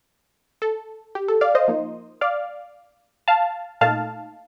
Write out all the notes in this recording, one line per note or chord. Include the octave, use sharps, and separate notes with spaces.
A4
G4
A4
D5 F5
C5 D#5
F3 A#3 D#4
D5 F5
F5 A5
A#2 A3 D#4 F5 A5